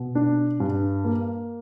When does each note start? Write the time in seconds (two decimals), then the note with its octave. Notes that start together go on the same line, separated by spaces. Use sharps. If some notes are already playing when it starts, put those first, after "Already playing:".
Already playing: B2
0.15 D4
0.60 G2
1.05 A#3